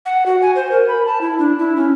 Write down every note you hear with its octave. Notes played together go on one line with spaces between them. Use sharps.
F#5
F#4
G#5
C5
A#4
B5
A5
E4
D4
E4
C#4